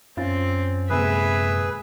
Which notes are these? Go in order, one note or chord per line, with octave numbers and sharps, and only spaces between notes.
F#2 C4 C#4 F4 A6
D#1 C3 G#3 B3 G#4 B4 E5